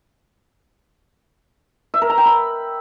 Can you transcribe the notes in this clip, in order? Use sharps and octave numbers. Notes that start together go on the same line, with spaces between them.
E5
A#4
A#5
G5
B5